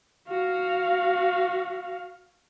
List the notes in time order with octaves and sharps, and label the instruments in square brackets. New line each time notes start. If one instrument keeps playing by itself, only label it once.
[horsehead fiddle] F#4 F5